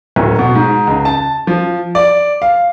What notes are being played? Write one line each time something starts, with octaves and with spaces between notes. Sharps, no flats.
D1
B2
G#2
C#2
A5
F3
D5
F5